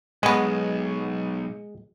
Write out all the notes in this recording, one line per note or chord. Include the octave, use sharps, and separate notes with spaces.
B1 G#3 B3 C#4